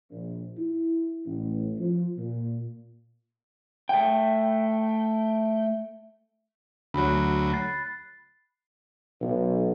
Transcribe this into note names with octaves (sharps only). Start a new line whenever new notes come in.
A#1
E4
A1
F3
A#2
A3 G5
D2 F#3 B5 F#6
F#6 A6 C7
B1